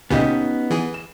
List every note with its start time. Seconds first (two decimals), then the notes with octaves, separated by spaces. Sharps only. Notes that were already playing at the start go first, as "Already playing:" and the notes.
0.10 C#2 A#2 C#3 B3 C#4 D#4 G4 D#5
0.70 E3 G#4
0.94 E7